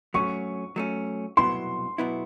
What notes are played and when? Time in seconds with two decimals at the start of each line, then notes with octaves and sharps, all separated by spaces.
0.14 F#3 A3 C#4 C#6
0.76 F#3 A3 C#4
1.37 C2 B2 F#3 B3 E4 C6
1.98 B2 F#3 B3 E4